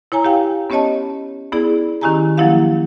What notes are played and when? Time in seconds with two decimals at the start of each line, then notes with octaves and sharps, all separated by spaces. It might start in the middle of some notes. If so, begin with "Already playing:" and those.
0.12 E4 C#5 G#5 A#5
0.24 G4 F5 G5
0.70 B3 C#4 G4 C#5 D#5 A5
1.52 B3 E4 G#4 D5
2.01 D#3 C#4 E4 G4 G#5 A#5
2.38 F3 F#3 A#3 E4 G4 F5